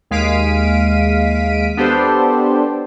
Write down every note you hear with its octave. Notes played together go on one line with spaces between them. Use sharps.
D#2 G#3 F5 B6 D7 D#7
B3 D4 G4 A4 C5